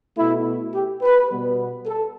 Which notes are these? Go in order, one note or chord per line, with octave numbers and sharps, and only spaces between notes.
B2 A3 E4
G4
B4
B2 G3 B3
A4